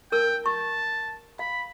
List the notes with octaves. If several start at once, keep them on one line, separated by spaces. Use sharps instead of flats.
D#4 A#4 G5 E6
A5 C#6
F5 B5